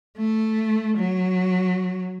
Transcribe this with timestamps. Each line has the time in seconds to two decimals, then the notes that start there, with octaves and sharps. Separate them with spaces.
0.17 A3
0.97 F#3